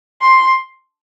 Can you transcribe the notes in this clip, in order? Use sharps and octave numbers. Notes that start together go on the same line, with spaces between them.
C6